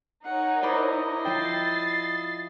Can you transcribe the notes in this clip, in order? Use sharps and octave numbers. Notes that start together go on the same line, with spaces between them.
D#4 A#4 C#5 F#5
E4 C5 D5 D#5 B5
F3 G5 A6 C7